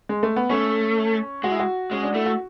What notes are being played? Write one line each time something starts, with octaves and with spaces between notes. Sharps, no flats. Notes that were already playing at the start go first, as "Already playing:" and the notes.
G#3
A3
B3
A3 C#4
G#3 F#4
E4
F#4
G#3 C#4
D4
A3 E4
F#4